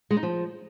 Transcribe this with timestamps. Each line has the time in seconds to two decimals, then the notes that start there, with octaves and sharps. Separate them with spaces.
0.11 G#3
0.17 D#4
0.23 F3